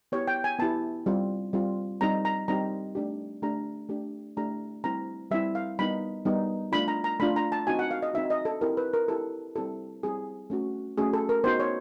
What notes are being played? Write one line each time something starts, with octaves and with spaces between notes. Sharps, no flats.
B3 E4 G4 C#5
G5
G#5
B3 E4 G4 A5
G3 C4 F4
G3 C4 F4
G3 C4 D#4 G4 A#5
A#5
G3 C4 D#4 G4 A#5
A3 D4 G4
A3 D4 G4 A#5
A3 D4 G4
A3 D4 G4 A#5
G3 C4 E4 A#5
G3 C4 E4 E5
F5
G3 B3 D#4 B5
G3 B3 D#4
A3 D4 F4 B5
A#5
A#5
A3 D4 F4 B5
A#5
A5
C4 D#4 F#4 G#5
F#5
F5
D#5
C4 D#4 F#4 E5
D#5
A4
C4 E4 G4 A#4
B4
A#4
C4 E4 G4 A4
G3 C4 E4 G4 A4
G3 C4 E4 G4 G#4
A3 C#4 F#4
A3 C#4 F#4 G#4
A4
A#4
B3 D#4 F#4 C5
C#5